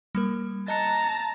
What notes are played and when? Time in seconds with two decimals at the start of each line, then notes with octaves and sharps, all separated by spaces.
0.15 G3 A#3 A#4
0.68 D#5 A5 A#5 F#6 C#7